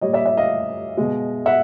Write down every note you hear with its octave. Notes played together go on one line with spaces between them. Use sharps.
A#2 G3 C#5 D#5
D5 E5
D5 E5
D#5 F5
B2 G#3
E5 F#5